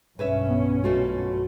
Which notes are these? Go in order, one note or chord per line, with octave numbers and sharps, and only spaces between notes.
B1 G2 C#4 B4 C#5 E5
B3
B2 A3 F4 F#4